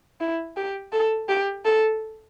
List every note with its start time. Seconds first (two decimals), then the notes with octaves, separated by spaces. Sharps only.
0.20 E4
0.57 G4
0.92 A4
1.29 G4
1.65 A4